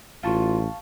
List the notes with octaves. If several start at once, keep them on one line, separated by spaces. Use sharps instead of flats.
A1 F4 F5 A5 C#6